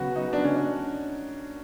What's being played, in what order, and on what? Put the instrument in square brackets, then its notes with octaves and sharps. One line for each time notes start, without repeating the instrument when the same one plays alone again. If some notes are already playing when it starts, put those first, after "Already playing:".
Already playing: [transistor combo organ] C#3 F#3 B3 [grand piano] F#4
[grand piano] D#4
D4
C#4
D4